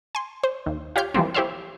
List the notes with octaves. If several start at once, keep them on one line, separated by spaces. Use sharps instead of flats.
G#5 C6
C5
D#2
F4 G4 C#5 F6 G6
E3 F3 G3 A#3 C4
E4 G4 C5 C#5 E5 F5